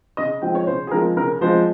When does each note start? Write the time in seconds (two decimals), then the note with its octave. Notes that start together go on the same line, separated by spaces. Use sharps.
0.17 C#3 D#5
0.42 F3 G#3 C4 G5
0.55 C#5
0.66 C#3 C5
0.87 G#4
0.91 F3 G#3 C4 A#4
1.16 C#3 A#4
1.41 F3 G#3 C4 C5